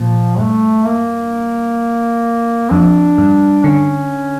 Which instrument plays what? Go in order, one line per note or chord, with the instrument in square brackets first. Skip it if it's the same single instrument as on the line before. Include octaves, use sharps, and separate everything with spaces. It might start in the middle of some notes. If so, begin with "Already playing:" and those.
Already playing: [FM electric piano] A#2 [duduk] F3
[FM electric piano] G2 [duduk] A3
[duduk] A#3
[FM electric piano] F2 [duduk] D4
[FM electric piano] G2
[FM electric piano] D3 [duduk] C#4